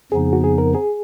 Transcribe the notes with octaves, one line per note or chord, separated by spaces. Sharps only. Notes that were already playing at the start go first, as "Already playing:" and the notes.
F2 C#3 F3 B3 D#4 G#4
F#4
G#4
A#4
G#4